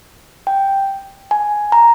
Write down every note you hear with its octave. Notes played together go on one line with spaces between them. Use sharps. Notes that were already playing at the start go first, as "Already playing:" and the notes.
G5
G#5
A#5